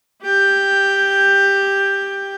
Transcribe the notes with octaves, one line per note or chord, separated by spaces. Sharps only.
G4 G5